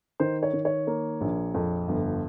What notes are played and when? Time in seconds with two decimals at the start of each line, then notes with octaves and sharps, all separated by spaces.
0.20 D#3 C5
0.43 C#5
0.53 D#3
0.65 C#5
0.87 A#3
1.21 A#1
1.54 F2
1.88 G1